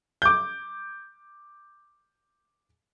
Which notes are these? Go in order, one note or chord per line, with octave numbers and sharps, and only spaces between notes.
D6 G6